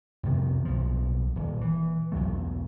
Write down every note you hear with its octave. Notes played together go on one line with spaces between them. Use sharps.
F2 C3 D#3 B3
B1 F3
D#1
E3
B1 E2 F#3 A3